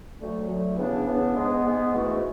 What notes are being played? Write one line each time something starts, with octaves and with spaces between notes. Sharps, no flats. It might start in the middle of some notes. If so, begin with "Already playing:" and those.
D2 D3 F#3 A3
D2 D3 F#3 A3
C#3 E3 B3 D4
C#3 E3 B3 D4
G#2 G#3 B3
G#2 G#3 B3
G#2 E3 A3 D4 F#4